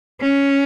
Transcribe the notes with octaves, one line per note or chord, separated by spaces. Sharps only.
C#4